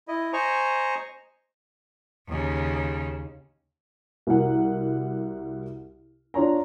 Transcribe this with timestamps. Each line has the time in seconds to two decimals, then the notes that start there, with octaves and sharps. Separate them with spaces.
0.08 E4 D#5
0.33 C5 D#5 G#5 A#5 C#6
2.28 D#2 C#3
4.27 C2 F#4 A#4 F#5
6.34 D4 F4 C#5 A#5